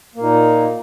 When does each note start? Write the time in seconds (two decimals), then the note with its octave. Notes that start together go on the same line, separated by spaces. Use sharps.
0.15 A#3
0.19 A#2
0.22 D#4